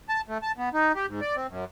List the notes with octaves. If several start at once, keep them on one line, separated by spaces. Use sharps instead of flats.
A5
A3
A5
B3
D#4
G4
G#2
D5
C4
F#2